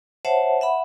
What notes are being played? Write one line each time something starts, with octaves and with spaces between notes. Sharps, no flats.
C5 C#5 E5 F#5 A5
E5 F#5 B5